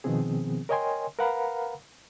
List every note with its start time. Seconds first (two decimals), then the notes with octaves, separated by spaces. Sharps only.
0.04 B2 D#3 F3 B3 C4 G#4
0.69 A#4 C#5 D#5 G5 G#5 C6
1.19 A#4 B4 F5 F#5 A#5 B5